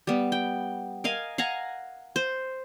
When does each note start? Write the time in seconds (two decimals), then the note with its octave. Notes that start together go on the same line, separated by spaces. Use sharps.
0.07 G3 B3
0.32 G5
1.04 A#4 D#5 F5 G#5
1.38 F5 F#5 G#5 A#5
2.16 C5